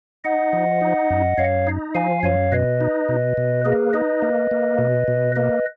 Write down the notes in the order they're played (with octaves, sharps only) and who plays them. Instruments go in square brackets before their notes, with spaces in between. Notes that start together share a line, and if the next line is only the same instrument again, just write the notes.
[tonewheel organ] D#4 [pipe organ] D#5 F#5
[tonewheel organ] F3
D#4
F#2
[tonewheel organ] F#2 [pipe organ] C#5 F5
[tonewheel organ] D#4
[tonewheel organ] F3 [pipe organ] F5 G#5
[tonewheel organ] F#2 [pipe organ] C#5 F5
[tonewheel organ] B2 [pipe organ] B4 D#5
[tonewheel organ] D#4
B2
B2
[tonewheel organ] A#3 [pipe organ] G#4 B4
[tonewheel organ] D#4 [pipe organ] B4 D#5
[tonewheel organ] A#3
A#3
B2
B2
[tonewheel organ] A#3 [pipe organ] B4 D#5